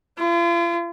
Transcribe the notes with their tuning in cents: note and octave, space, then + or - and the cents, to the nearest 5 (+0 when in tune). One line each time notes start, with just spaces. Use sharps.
F4 -40